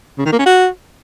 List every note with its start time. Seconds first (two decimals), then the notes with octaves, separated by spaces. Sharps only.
0.18 C#3
0.25 D#3
0.32 A#3
0.39 C#4
0.46 F#4